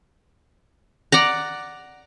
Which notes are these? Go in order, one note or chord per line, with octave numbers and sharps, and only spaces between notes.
D5 F#5 A#5